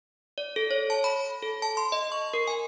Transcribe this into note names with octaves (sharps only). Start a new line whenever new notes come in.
D5
A4
C#5
A5
B5
A4
A5
C6
D#5
C#6
A#4
G#5